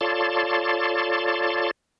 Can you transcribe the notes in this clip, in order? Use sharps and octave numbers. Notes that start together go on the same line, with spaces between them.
F4 A4 C#5 D5 A5 C6